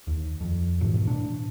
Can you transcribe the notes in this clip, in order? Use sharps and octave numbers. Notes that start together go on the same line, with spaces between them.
D#2
F2
G#2 B2 E3
A2 D4